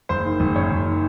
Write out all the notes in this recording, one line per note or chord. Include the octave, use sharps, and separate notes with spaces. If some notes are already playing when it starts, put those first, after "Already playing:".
F#1 C5
D#3
F#1
F#2 C#5
F#1
D#3